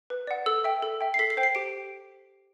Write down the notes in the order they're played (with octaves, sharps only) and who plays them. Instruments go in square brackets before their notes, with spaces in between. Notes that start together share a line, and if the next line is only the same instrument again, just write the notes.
[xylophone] B4
D5 F#5
A4 E6
E5 G5
A4
E5 G5
C7
A4 B6
C7
C5 G5
C7
G4 D7